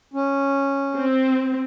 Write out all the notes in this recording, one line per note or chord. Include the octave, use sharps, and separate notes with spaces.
C#4
C4